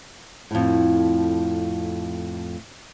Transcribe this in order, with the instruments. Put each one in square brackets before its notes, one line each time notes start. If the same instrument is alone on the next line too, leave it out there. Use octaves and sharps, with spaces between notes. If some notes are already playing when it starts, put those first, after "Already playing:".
[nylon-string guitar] F2 A2